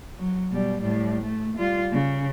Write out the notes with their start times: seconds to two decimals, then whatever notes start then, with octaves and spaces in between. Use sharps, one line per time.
0.18 F#3
0.52 B2 G3
0.81 A2 G3
1.21 A3
1.56 G3 F4
1.92 C#3